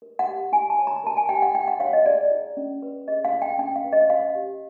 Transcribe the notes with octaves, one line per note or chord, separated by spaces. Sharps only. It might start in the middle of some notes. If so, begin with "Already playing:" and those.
A#4
F#5
G4
E4 G#5
A5
C#5
A#5
A#4 A5
G#5
G4 G5
F#5
E4 G5
F#5
C#5 F5
D#5
G#4 D5
E4
C#4
B4
G#4 D#5
F5
E4
G5
C#4 G5
F5
B4
D#5
C5 F5
G4